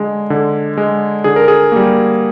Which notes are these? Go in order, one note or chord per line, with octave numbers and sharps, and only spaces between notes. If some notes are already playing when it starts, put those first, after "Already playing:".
Already playing: D3 G#3
D3
G#3
D3 G#4
A#4
G#4
G3 A#3